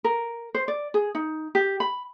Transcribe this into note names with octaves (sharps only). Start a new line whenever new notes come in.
A#4
C5
D5
G#4
D#4
G4
B5